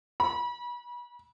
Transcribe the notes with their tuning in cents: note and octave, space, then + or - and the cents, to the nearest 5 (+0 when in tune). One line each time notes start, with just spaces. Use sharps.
B5 -35